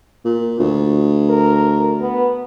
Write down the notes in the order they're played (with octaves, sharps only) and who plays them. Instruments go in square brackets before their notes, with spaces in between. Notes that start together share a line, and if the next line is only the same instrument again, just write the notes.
[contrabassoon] A#2
D2
[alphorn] A#4
B3